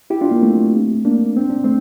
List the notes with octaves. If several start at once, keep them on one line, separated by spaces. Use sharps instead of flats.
E4 G4
D4 F4
A#3
A3 C4
A#3 D4
C4
D4
A3 C4